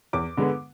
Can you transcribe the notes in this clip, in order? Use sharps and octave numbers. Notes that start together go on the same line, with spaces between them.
E2 D6
D3 G#3 B3